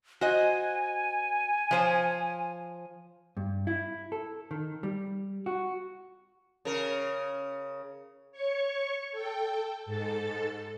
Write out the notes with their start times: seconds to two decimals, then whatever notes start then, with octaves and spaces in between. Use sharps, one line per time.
0.21 F#4 C5 D#5 G#5
1.71 F3 C5 C#5
3.37 G2
3.67 E4
4.12 A4
4.51 D#3
4.83 G3
5.46 F#4
6.65 C#3 A#4
8.32 C#5 C#6
9.11 A4 G5
9.86 G#2 A4 A6